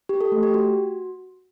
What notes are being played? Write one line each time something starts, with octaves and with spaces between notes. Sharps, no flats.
G4
A4
A3
G4
F#4